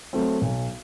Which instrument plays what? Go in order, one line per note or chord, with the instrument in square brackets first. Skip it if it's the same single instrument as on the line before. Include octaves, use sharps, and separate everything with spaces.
[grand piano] F#3 A3 C4
B1